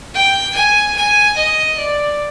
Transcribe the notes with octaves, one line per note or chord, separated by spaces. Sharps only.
G5
G#5
G#5
D#5
D5